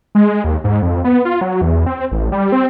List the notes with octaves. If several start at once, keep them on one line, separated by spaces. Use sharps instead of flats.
G#3
D#2
G#2
F2
B3
F4
F#3
E2
C4
A1
G3
C4